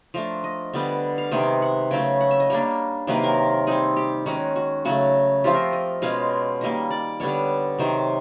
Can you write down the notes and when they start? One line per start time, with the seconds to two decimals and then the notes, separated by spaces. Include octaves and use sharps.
0.14 F3 A3 D4 A#4
0.44 D#5
0.74 D3 G3 B3
1.18 F5
1.32 C3 D#3 G#3 B3 G5
1.62 F#5
1.91 C#3 F#3 A3 G5
2.21 F#5
2.31 E5
2.40 D#5
2.50 G3 A#3 D4 C#5
3.07 C3 D#3 F#3 A#3 B4
3.24 A#4
3.67 G3 C4 D#4 G#4
3.97 G4
4.26 D#3 G#3 C#4 F#4
4.56 F#4
4.85 C#3 F#3 A3 F#4
5.44 F3 A3 C4 F4 G4
5.54 A#4
5.73 D#5
6.02 B2 G#3 C#4 F4 F5
6.61 D#3 G3 A#3 D#5
6.91 D5
7.20 D3 G3 B3 D4 C#5
7.79 C3 D#3 F#3 C5